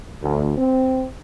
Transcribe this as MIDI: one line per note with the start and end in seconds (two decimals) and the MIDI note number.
0.23 0.57 38
0.58 1.08 60